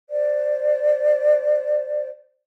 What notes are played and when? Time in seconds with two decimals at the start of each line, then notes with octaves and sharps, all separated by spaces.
0.09 C5 D5